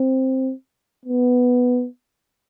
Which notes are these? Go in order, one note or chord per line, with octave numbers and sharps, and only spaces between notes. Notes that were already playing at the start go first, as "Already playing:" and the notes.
Already playing: C4
B3